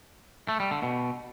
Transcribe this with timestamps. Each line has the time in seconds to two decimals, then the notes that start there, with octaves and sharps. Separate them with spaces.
0.48 A3
0.60 G3
0.71 D3
0.83 B2